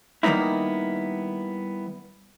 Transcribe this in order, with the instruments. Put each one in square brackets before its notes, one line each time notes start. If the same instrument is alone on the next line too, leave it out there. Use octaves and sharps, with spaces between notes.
[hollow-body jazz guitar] D#3 G3 A#3 B3 D#4 E4